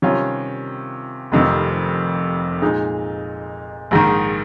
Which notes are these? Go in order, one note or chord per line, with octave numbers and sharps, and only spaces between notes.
C3 D#3 G3 C#4 F4
F1 F2 C3 D#3
A#2 G#3 D#4
A#1 G#2 D#3